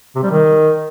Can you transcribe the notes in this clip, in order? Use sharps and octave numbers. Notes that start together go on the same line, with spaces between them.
C3
G3
D#3